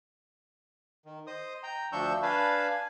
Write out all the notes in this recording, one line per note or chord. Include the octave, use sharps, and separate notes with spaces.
D#3
C5 D#5 D#6
G5 A#5
D2 F3 D4 C#6 E6 G6
D4 B4 F5 G#5 A5 B5
G#5